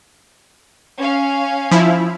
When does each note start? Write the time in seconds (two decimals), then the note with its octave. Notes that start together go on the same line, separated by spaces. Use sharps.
0.99 C#4 F5
1.71 F3 E4